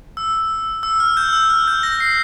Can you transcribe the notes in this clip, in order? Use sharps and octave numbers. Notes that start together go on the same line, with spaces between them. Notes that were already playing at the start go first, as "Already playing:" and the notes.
E6
E6
F6
G6
E6
F6
G6
A#6
C7